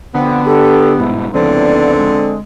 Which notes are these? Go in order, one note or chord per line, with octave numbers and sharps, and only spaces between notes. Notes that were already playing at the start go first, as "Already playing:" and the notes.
F2 D3 B3 C4
D4 G4 A4
G1 G#2 B2 E4
C#2 A2 D3 F3 B3 C4 D5
G#3